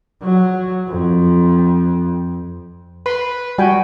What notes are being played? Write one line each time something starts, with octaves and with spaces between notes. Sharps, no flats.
F#3
F2
B4 C6
G3 F#4 G5 G#5